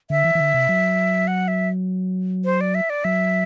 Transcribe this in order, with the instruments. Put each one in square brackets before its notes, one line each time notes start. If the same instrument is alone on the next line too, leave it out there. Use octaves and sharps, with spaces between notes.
[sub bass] D3 [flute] E5
[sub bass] E3
E3
D3
C3
F#3
[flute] F#5
E5
C5
D5
E5
D5
[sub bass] F#3 [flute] E5